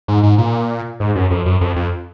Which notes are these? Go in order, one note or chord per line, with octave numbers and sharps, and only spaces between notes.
G#2
G#2
A#2
G#2
F#2
F2
F#2
F2
F2